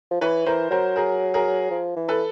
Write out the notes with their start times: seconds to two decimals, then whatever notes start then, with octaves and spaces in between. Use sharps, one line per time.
0.11 F3
0.21 E3 B4 C#5
0.46 E3 A#4 C5
0.71 F#3 A#4 C5
0.96 G#4 A#4
1.34 G#4 A#4
1.71 F3
1.96 E3
2.08 A4 B4